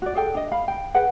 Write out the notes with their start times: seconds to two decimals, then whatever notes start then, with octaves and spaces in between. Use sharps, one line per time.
0.02 F#4 D5
0.15 G#4 A4 G5
0.35 D4 D#5
0.52 F5 B5
0.68 G5
0.94 G#4 B4 F#5 G5